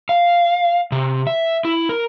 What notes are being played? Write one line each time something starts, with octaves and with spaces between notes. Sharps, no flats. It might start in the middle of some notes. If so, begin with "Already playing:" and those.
F5
C3
E5
E4
A#4